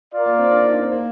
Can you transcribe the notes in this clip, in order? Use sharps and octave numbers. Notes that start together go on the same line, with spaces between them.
F4 A#4 D5
A#3
C4
D4
D#4
D4
C4
A#3